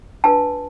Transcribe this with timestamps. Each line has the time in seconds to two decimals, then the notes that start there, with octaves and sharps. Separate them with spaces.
0.24 D4 F4 B4 A5